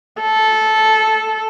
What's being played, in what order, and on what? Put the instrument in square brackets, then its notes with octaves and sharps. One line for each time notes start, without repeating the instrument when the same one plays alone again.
[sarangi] A4